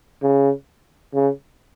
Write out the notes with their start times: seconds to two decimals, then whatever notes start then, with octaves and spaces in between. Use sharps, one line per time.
0.23 C#3
1.14 C#3